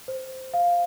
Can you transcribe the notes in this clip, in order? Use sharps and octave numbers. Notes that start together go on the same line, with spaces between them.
C5
F5